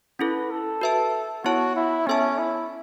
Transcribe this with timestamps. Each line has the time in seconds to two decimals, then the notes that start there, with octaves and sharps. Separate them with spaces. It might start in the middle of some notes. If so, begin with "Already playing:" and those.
0.19 C#4 E4 A4 B4
0.51 A4
0.81 F#4 B4 E5 A5
1.44 B3 E4 F#4 C#5 A5
1.76 E4
2.07 B3 C#4 A4 E5 A5
2.38 E4